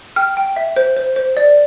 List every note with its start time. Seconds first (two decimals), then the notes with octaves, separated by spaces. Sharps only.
0.16 G5 F6
0.37 G5
0.56 E5
0.76 C5
0.97 C5
1.16 C5
1.37 D5